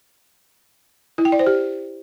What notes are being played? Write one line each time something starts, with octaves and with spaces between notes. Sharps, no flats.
E4
G5
D5
C5
G4